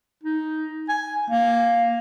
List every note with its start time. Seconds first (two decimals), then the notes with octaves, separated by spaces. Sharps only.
0.23 D#4
0.89 G#5
1.30 A#3